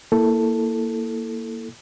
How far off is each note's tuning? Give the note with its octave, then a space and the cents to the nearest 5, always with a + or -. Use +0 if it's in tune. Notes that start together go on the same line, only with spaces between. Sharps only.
A#3 +0 E4 +0 A4 +0